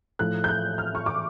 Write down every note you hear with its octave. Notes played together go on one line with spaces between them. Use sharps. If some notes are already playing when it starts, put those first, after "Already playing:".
A2 F3 A3 F#6
G6
F#6
F6
C#6
D6